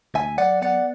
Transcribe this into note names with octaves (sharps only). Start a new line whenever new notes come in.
D2 E5 G#5
F#3 D5 F#5
B3 D5 F#5